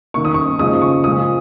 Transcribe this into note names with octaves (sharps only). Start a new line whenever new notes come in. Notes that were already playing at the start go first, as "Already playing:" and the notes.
D#3 A#3 C#6
D#6
C#6
C#3 F3 G#3 D#6
C#6
A#2 F3 G#3 D#6